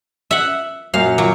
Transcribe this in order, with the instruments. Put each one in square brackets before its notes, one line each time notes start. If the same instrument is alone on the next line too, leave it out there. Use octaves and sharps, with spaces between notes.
[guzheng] E5 F#5
[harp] F#2 A#2 F#3 [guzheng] F5
[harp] D#3 F4 D6 [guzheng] F#3